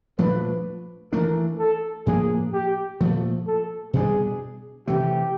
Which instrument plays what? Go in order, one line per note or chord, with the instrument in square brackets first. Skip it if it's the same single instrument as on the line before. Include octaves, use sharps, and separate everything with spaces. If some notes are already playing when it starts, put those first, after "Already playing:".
[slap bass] A#2 F3 A3 D4 [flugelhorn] B4
[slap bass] E3 A3 D4 [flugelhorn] A#4
[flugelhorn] A4
[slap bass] A2 F3 A#3 D4 [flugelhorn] G#4
[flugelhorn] G4
[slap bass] A#2 F3 A3
[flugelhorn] A4
[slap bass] B2 G3 B3 D4 [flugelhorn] G#4
[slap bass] C3 E3 A3 [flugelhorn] G4